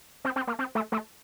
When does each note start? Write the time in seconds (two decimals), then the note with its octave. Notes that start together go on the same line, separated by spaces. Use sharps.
0.25 C4
0.36 C4
0.47 A#3
0.59 C4
0.75 A3
0.92 A3